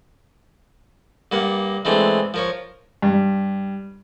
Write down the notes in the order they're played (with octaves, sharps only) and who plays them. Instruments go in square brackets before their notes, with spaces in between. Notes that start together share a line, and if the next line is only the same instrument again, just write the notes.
[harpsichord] G2 A#3 F#5
E3 G#3 A3 C4 D4
F3 A#4 C#5
[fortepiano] G2